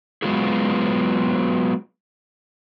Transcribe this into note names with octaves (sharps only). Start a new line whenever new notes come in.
F#3 G#3 B3 F4 F#4 G#4